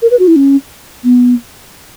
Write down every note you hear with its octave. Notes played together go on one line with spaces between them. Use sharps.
A#4
B4
F#4
E4
C#4
B3